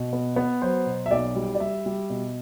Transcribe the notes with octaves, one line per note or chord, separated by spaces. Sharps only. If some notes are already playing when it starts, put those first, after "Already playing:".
Already playing: B2
B3
B3
F#3 C5
B2
E5
B1 D5
G3
D5
G3 E5
G3
B2